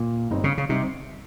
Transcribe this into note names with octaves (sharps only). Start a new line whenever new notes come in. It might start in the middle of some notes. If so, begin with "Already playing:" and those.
Already playing: A#2
G1 G2 G3 C4 D#4
C#3
C#3
C3 G3 C4 D#4